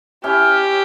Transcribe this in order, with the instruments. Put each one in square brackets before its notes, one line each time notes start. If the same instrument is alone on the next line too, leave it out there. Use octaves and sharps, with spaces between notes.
[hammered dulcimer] C#4 E4 [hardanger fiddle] G4